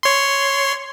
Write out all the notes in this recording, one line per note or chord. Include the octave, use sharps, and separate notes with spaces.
C#5 C6